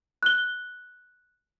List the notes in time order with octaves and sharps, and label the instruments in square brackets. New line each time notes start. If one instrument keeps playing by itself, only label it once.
[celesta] F#6 G7